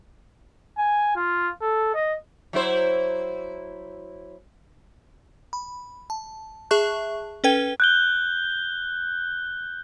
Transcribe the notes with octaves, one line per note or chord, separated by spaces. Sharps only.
G#5
F4
A4
D#5
F#3 E4 C5
B5
A5
G#4 E5 A5 C#6 F#6
C#4 A4 B4 G5 G#6 G7
F#6 G6 G7